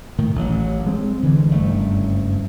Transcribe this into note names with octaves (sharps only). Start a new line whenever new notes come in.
A2 D#3
A1 F#3
G#3 C4
D3 E3 G#3
F#1 G2 A3